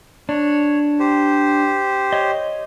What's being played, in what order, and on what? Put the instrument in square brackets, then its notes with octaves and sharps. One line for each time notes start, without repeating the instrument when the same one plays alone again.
[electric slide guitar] D4 [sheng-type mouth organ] C#5
[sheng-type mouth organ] G4 C5
[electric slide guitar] C#5 D#5